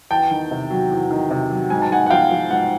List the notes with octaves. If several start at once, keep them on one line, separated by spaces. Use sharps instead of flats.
E2 G5 A5
D#3
C3
F#3
E2
D#3
C3
F#3
G#2 G#5
A5
G#2 F#5 G#5
F#5
F3 F5 G5
F3
G#2 F#5